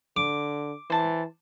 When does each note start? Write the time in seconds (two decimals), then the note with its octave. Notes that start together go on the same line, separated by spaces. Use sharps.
0.17 D3 D6
0.90 E3 C5 A5